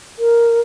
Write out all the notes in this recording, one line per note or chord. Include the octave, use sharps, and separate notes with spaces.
A#4